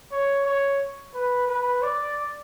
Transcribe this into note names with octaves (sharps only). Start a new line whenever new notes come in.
C#5
C#5
B4
B4
D5